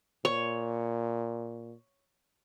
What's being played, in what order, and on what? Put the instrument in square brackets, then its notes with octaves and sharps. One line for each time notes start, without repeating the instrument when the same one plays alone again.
[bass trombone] A#2 [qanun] C#5